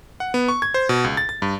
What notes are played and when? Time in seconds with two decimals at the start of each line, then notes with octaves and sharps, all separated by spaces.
0.20 F#5
0.34 B3
0.48 C#6
0.62 G#6
0.74 C5
0.89 B2
1.04 C#2
1.17 A6
1.29 A6
1.42 G2